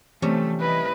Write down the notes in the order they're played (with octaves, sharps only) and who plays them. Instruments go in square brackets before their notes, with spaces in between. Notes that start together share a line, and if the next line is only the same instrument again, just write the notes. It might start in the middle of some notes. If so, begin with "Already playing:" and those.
[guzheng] C3 G3 C#4 [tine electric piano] E3 [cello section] F3 A3
[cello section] E4 D#5 [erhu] B4